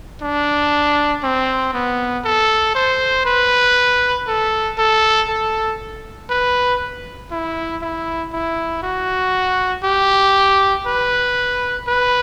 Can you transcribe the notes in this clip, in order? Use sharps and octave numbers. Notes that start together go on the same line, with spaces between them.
D4
C4
B3
A4
C5
B4
A4
A4
A4
B4
E4
E4
E4
F#4
G4
B4
B4